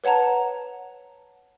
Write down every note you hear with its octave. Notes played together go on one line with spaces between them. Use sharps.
B4 C#5 F#5 A5 A#5